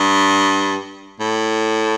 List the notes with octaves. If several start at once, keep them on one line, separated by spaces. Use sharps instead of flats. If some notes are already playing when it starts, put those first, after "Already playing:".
Already playing: G2
A2